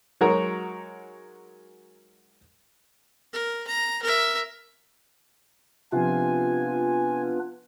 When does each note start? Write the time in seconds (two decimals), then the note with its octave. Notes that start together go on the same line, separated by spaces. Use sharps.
0.21 F#3 G#3 D#4 F#4 A#4 C#5
3.33 A#4
3.67 A#5
4.03 A#4 E5
5.92 C3 F3 B3 D4 F4 B4 G#5